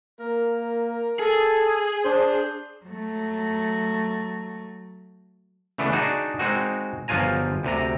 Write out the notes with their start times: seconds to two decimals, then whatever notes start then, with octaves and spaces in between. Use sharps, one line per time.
0.20 A#3 A#4
1.19 G#4 A4
2.05 D4 C5
2.85 F#3 A3
5.78 C#3 E3 A3 B3 D4
5.92 D4 D#4 F#4 G#4
6.39 G#3 C4 D#4 F#4
7.08 G1 F3 F#3 F4 G#5 A#5
7.63 D2 C3 A#5